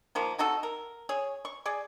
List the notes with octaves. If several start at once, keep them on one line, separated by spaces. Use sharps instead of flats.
D#3 F3 A#3
C3 D#4 F#4 A4
A#4
G#4 C#5
C#6
G#4 D5